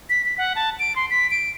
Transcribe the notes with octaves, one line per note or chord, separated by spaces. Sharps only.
B6
B6
F#5
A5
D7
C6
B6
D7